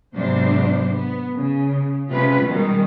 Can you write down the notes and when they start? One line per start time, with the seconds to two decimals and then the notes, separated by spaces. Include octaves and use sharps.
0.18 G#2 C3 F#3 B3 D4 C5
0.93 B3
1.36 C#3
2.12 C3 G#3 C#4 F4 B4
2.47 B2 D#3 G3 G#3